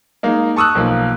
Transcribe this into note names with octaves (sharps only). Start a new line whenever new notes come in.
G#3 A#3 D#4
A5 C#6 D#6 E6 F#6
B1 F3 A#3